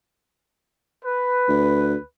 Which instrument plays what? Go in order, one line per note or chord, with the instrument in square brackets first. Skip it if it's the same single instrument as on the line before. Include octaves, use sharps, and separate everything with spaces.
[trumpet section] B4
[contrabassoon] D2